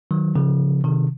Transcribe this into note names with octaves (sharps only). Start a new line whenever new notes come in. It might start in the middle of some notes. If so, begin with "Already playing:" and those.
D#3 F#3
C#3 F3
C3 D#3